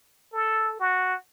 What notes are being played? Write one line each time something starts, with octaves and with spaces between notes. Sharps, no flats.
A4
F#4